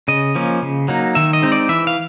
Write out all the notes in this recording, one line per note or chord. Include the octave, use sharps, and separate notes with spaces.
C#3 D#5
F3 A#3 C#4
C#3
F#3 A#3 D#4
D#3 E5
D#5
G#3 C4 D#4
D5
E3 E5
F5